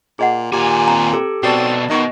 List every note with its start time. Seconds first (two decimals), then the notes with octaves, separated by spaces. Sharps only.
0.19 A#2 G#4 D#5 F#5
0.52 D#2 A#2 G4 G#5
0.88 C4 A#5
1.13 G4 A4
1.43 B2 C4 F#4 A4 D5 A5
1.90 B2 D#3 D#5